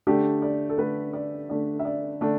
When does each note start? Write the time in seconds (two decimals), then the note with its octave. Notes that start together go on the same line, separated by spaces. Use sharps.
0.07 D3 A3 D4 G4
0.42 D5
0.69 A4
0.78 D3 A3 D4 B4
1.13 D5
1.49 D3 A3 D4 D5
1.79 E5
1.85 D5
2.21 D3 A3 D4